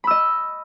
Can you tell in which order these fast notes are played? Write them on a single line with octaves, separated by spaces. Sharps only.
B5 E6 D#5